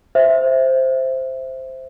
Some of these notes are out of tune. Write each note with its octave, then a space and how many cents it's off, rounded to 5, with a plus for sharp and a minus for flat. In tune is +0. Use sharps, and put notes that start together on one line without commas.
C5 +0 E5 +0